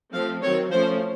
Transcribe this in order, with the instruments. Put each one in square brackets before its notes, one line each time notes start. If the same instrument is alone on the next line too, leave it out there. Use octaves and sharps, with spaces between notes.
[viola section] F3 A3 C4 F5
D#3 F#3 C4 C#5
F3 A3 C#4 C5